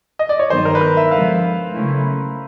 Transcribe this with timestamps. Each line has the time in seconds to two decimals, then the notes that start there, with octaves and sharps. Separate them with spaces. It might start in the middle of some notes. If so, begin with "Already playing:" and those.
0.19 D#5
0.29 D5
0.39 C#5
0.50 G2 D#3 F#3 B3 D#4 C5
0.65 A#4
0.75 B4
0.81 A#4
0.97 E5
1.11 D3 F3 G#3 B3 F5
1.74 C#3 F#3 A3 C#4 E4